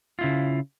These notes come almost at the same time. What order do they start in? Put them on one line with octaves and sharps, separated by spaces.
F4 E4 C#3